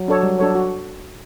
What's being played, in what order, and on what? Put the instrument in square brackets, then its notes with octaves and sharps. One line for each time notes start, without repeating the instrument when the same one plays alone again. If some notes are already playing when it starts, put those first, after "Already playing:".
Already playing: [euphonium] F#3
[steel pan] D4 A4 C#5
G3
D4 A4 C#5
F#4